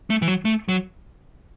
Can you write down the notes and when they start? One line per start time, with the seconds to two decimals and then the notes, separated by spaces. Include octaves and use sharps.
0.10 A3
0.22 E3
0.28 F#3
0.45 A3
0.68 F#3